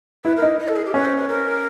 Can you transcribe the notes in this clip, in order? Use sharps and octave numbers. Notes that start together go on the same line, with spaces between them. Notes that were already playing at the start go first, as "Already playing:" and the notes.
E4 B4
A#4
D#4
D#5
A4
G#4
G4
C#4 B4
C5
B4
A#4